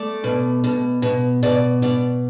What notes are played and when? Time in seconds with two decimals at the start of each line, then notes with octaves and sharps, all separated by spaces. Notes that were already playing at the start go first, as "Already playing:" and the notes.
Already playing: A3 D5
0.24 B2
0.64 B2
1.02 B2
1.43 B2 D5
1.82 B2 D5